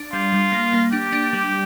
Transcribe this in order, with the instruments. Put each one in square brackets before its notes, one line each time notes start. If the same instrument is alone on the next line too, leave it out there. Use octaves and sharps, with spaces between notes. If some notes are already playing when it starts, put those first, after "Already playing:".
Already playing: [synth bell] D4
[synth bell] G3 [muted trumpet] F4
[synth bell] G3
A#3
A#3
[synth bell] D4 [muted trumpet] G4
[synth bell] D4
G3